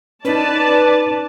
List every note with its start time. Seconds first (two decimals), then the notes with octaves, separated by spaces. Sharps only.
0.25 C#4 D#4 B4 D5 A5